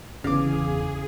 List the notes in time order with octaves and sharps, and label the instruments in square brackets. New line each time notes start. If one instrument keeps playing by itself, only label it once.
[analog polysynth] G1 E2 [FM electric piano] C#3 [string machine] G#4 [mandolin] F5 D6